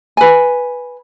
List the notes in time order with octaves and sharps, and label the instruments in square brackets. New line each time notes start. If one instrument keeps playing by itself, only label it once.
[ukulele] B4 G#5